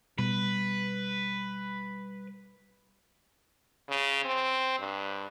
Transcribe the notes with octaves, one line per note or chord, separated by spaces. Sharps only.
B2 G3 B4
C#3
C4
G2